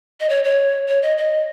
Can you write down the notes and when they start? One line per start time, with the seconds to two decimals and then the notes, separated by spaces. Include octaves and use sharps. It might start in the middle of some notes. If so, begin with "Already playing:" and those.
0.20 D#5
0.29 C#5
0.44 C#5
0.88 C#5
1.03 D#5
1.18 D#5